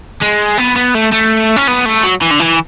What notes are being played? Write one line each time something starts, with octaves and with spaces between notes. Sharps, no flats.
G#3
B3
B3
A3
A3
C#4
B3
A3
F#3
E3
D3
E3